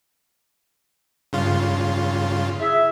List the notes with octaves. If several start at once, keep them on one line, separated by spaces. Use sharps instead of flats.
G2 C#3 F4
E4 G#4 E5